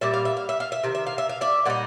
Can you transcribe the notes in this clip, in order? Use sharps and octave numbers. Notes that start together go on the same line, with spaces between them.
A#2 G3 E5
F5
E5
F5
E5
F5
E5
C3 D#3
E5
F5
E5
F5
D5 E5
A#2 G3 D#4 F#5